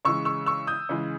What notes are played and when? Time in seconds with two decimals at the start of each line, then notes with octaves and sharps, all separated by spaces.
0.05 C#3 E3 G#3 C#6 E6
0.25 C#6 E6
0.46 C#6 E6
0.67 D#6 G6
0.89 C#3 E3 G#3